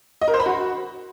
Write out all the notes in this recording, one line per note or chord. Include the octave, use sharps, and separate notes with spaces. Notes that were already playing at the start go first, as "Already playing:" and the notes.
D#5
A#4
C5
B5
F#4